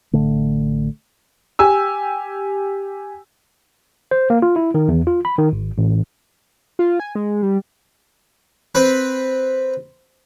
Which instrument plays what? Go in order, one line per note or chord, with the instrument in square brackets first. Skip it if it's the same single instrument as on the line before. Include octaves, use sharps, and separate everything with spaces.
[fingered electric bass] A1 D3 A3
[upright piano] G4 G#5 E6
[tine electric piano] C5
A#3
F4
E4
D#3
E2
F4
B5
D#3
G#1
A1
[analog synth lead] F4
G#5
G#3
G3
[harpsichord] C4 B4